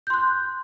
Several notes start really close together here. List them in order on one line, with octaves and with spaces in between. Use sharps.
G6 C6 F#6